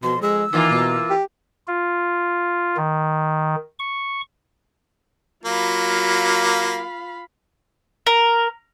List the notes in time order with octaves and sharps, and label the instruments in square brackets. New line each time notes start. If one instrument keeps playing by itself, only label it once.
[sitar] F2 [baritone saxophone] B2 [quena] C6
[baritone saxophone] G#3 [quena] E6
[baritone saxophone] D#3 [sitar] E3 A#3 F4
[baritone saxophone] B2
G4
[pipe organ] F4
D#3
C#6
[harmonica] F#3 A#3 [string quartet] F4 F5 B5
[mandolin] A#4